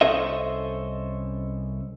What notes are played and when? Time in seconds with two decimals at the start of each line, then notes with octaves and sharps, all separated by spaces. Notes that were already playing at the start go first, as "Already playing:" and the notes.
0.01 C2 C#4 A4 C5 D#5 E5